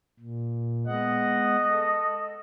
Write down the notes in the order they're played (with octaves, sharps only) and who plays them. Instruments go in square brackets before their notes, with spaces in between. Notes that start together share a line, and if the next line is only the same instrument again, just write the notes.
[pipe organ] A#2
[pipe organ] G#3 B3 F#5 [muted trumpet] D#5
[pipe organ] A4